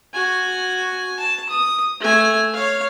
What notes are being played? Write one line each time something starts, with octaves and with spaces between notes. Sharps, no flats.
F#4 G#5
A5
D#6
A3 G#5
C#5 F5